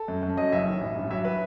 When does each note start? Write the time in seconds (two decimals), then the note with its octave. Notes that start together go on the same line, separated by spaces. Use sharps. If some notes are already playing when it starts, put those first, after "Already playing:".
Already playing: A4
0.08 F#2
0.23 F#2
0.37 F#3 D#5
0.52 F#1 E5
0.66 D#3
0.81 A1
0.96 G2
1.10 F#3 E5
1.25 B4